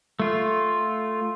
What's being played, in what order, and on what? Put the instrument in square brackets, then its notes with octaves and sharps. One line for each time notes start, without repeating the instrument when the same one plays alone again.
[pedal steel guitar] A3 F4